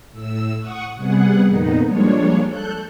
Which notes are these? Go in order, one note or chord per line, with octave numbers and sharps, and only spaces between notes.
A2 E6
F#5 C#6 D#6
C3 G3 B3 G#4 F#5
F2 A#2 D#3 B3 D#4
F3 G3 G#3 A#3 D4 C#5
A4 F#6 G6